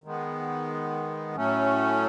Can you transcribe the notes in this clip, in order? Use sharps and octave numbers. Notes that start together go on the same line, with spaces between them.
D#3 G#3 B3
A2 F#3 A3 C#4